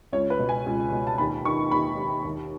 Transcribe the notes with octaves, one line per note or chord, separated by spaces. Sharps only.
C#2 C#5
B4
B2
G#5
C#2
B2
A5
D#2 B5
D#3 C#6
D#2 B5
D#3
D#2